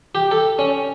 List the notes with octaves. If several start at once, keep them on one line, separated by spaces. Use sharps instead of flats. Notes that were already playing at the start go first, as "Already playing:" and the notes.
G4
A4
C#4